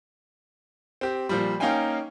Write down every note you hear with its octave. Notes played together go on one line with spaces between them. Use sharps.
C4 G4
A#2 F3 G3
A#3 C#4 D#4 F5 G5 G#5